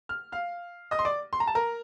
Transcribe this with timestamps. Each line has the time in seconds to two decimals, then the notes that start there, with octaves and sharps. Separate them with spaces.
0.09 F6
0.32 F5 F6
0.91 D#5 D#6
0.99 C6
1.05 D5 D6
1.33 C6
1.40 A#5
1.47 A5
1.55 A#4 A#5